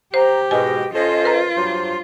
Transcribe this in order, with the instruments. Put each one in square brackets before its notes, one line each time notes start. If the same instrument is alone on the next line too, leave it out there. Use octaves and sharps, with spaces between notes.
[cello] G4 [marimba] C5 [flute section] A#5
[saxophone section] G#2 B2 [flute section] D#5 [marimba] G#5
[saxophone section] C#4 A4 C5 [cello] F4
[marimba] A#4 B4 A#5
[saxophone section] G2 F#3 C5 [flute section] C6